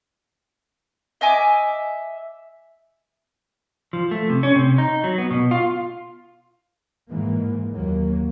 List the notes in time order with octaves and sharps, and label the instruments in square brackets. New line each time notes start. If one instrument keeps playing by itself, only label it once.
[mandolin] D#5 E5 G#5 D6
[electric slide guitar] F3
A3
C3
C#4
C3
D#4
F#3
B3
B2
F4
[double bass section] G#2 E3 A#3
D#2 F#3 A#3